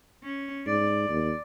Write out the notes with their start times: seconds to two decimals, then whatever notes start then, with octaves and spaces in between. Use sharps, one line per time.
0.23 C#4
0.66 G#2 D5
1.09 D#2